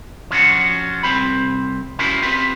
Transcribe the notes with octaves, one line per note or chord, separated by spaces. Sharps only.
F3 C#4 D4 F#4
C2 D#3 C4 C5 B5
C#4 E4 F#4 A#4 C5
C4 F4 G4 B4